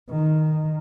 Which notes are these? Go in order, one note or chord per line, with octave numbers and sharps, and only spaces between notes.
D#3